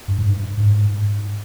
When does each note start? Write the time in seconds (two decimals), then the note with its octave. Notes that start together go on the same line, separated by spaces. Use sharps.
0.08 G2
0.18 G#2
0.28 G2
0.57 G#2